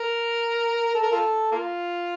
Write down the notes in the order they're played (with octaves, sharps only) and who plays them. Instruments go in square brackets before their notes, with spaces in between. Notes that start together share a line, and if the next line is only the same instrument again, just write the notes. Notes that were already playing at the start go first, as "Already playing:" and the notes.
Already playing: [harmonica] A#4
A4
A#4
F4 A4
A#3 F4